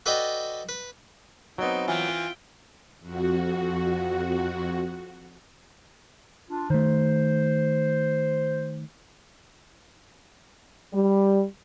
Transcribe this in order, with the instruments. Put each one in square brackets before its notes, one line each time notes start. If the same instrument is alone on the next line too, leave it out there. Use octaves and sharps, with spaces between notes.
[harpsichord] F#4 A4 B4 D5 D#5 G5
B4
[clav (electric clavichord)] F#3 B3 [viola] C4 G5 [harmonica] D#4
[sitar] E3 [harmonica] F4 [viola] G5
[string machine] F2 F#4
[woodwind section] D4 F4
[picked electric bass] D#3 A3 [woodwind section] C5
[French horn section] G3